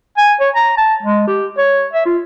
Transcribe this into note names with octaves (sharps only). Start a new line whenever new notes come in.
G#5
C#5
A#5
A5
G#3
G4
C#5
E5
F4